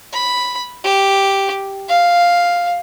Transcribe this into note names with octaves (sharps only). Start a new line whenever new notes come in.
B5
G4
F5